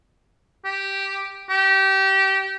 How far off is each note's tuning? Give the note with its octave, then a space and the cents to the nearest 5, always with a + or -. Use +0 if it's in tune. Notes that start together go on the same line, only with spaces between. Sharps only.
G4 -5
G4 -25